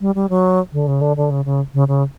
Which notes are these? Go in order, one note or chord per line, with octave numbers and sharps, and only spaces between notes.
G3
G3
F#3
D3
C#3
D3
D3
C#3
C#3
C#3
C#3